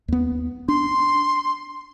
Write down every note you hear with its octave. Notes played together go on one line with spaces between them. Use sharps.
D#2 B3
D4 C6